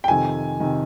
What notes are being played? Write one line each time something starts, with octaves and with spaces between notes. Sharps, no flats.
G5
F2 C3 D#3 G#5
C3 D#3